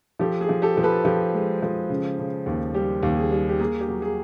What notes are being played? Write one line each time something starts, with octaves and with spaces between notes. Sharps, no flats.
F3 G4 A4
G#4
F3
G4 A4
F3
A4 B4
F3 G4 A4
G#3
F3
C#3
C#3
D#2
G3 G4
D#2
G#4
G3
G4
A#3 G#4
G4
F#3
G#4